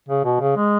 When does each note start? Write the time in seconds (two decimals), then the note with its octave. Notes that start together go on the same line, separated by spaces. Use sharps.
0.09 C#3
0.24 B2
0.40 C#3
0.57 G#3